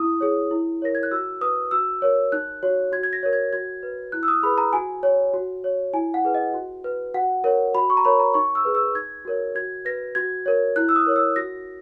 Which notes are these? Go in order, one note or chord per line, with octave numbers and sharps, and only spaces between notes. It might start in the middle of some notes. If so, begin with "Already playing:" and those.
Already playing: E4 D#6
G#4 C#5
E4
A#4 C#5 A#6
G#6
F#6
F#4 E6
B4 D#6
F#4 E6
A#4 C#5
D#4 F#6
F#4 C#5
F#4 G#6
G#6
A#6
A#4 C#5
G#6
F#4 G#6
B4
E4 F#6
E6
D#6
G#4 B4 B5
A#5
F#4 G#5
C#5
F#4
C#5
E4 G#5
F#5
G#4 B4
D#5
F#4
B4
F#4 F#5
A#4 C#5
F#4 B5
C#6
A#5
A#4 C#5 B5
A#5
D#4 C#6
E6
G#4 B4
E6
D#4 G#6
F#4 A#4 C#5
F#4 G#6
B4 A#6
F#4 G#6
A#4 C#5
E4 F#6
E6
D#6
A#4 C#5
E6
F#4 A#6